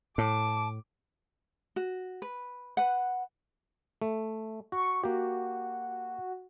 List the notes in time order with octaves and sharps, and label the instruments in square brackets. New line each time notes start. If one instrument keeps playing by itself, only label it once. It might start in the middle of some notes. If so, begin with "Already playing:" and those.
[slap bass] A2 [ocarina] A5 [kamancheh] D6
[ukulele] F#4
B4
B4 F#5
[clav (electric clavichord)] A3
[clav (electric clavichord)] F#4 [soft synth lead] C#6
[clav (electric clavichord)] A#3 G4 [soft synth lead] F#4